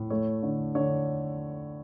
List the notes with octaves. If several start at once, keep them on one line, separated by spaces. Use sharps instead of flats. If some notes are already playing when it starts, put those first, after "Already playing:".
Already playing: A2
A3 C#5
D3
D3 C#5